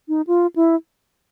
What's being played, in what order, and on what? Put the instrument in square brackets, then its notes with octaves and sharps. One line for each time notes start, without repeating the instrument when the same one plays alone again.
[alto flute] D#4
F4
E4